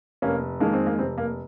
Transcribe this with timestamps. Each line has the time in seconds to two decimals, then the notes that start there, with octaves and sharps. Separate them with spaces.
0.22 F1 A#3 C#4
0.60 F2 D#3 G#3 A#3
0.73 C4
0.86 A#3
0.99 F1 C4
1.18 A#3